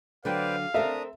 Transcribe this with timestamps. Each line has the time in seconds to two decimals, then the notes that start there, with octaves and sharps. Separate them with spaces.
0.25 D3 F#3 B4 C5 D5 F5 G5
0.74 C4 D4 A4 A#4 E5 A#5 D#6